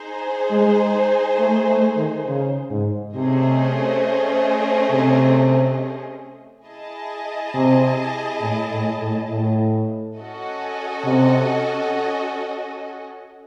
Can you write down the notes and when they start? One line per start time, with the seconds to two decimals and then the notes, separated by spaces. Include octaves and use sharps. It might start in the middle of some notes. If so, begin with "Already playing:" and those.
Already playing: D#4 G#4 C5
0.51 G#3
1.39 A3
1.68 A3
1.97 D#3
2.27 C#3
2.70 G#2
3.15 C3 A3 C#4 G#4 C5 D#5
4.91 C3
6.66 E4 G#4 D#5 A5
7.54 C3
8.41 A2
8.71 A2
9.00 A2
9.30 A2
10.17 C#4 F#4 A4 D#5
11.04 C3